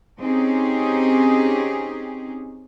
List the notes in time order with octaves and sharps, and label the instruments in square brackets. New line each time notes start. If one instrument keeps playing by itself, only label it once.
[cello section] C4 C#4 D#4 G4 G#4